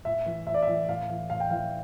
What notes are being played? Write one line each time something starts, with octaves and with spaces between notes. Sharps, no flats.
A2 E5
E3
A2 E5
D5
E5
E3
A2 F5
E3
A2 F5
G5
E3 F5